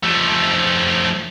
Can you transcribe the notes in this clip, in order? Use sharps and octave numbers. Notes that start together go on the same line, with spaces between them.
F3 A3